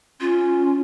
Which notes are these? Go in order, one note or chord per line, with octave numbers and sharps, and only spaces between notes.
C#4 F4